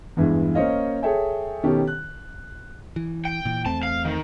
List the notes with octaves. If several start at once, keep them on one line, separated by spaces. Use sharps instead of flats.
E2 G2 E3 G#3
A#3 C#4 C5 C#5 D#5 F5
G#4 A4 C#5 E5 G5 G#5
B2 D#3 C#4 G4 A4
F#6
E3
G5
A#2 E3
E2 A3 C4 A5
F5
D#3